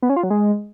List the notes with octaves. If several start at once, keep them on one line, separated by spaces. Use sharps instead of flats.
B3
C#4
F4
F#3
G#3